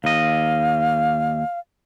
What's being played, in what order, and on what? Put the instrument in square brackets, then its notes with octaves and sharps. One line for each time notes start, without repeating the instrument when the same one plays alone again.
[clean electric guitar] D#2 D#5 [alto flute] F5